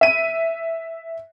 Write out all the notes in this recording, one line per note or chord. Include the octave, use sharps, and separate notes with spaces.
E5 D#7